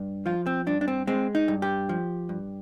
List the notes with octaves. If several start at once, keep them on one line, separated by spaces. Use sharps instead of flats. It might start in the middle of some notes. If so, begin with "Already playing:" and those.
Already playing: G2
F3 F4
C4
G2 D4
D4
C4
G#3 C4
D#4
G2
G4
F3
G2